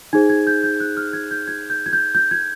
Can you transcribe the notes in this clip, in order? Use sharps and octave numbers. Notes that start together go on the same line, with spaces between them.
D#4 G#4 C5 G#6
G#6
G6
G6
F#6
F6
G#6
G6
G#6
G6
G#6
G6
G6
G#6